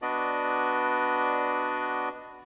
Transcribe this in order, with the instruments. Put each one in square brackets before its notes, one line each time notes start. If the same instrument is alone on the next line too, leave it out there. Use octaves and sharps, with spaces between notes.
[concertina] B3 D4 F#4 D5 D#5